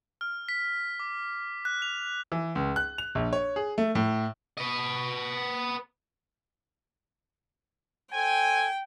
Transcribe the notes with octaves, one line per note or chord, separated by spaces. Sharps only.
F6
B6
D6
F#6
F7
E3
C#2
F#6
F7
A#1
C#5
G#4
A3
A2
B4 D#5
A4 C5 G5 G#5